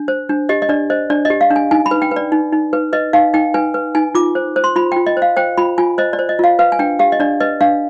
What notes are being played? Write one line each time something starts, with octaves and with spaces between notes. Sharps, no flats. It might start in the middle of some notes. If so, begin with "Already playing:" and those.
Already playing: D4
C5
D4
G4 D#5
D#5
D4 D5
C5 D#5
D4 D5
D#5
G4
F5
D4
G#5
D#4 G#5
B5
B4
G5
B4
D5
D#4
D#4
B4
B4 D#5
D#4 F5
D#4 G5
B4 G#5
B4
D#4 G#5
F4 D6
C5
C5
C6
F4 B5
G5
F4
D#5
C5
F5
C5 G5
F4 B5
F4 G#5
C5 D#5
D5
C5
D#5
F4 F5
B4 F5
G#5
D4 G5
G4 F5
D#5
D4 D5
B4 D#5
D4 F5